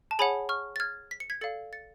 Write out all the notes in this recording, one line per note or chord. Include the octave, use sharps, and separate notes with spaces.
A5
G#4 C#5 F#5 G#5 B5
C#6 F6
A6
F6 G#6
B6
C#7
G#6 B6
A4 D5 F5 A6 C#7
A6 C#7